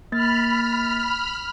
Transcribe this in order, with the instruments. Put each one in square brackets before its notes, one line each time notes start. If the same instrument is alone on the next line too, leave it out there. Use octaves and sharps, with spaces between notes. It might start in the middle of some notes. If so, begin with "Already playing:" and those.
[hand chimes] A#3 A6 [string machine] B5 F6